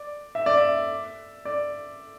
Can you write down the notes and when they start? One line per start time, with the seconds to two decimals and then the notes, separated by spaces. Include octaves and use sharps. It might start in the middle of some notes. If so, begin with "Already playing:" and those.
Already playing: D5
0.35 E5
0.46 D5
0.57 E5
1.45 D5